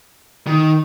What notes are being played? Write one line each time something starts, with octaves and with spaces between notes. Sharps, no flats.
D#3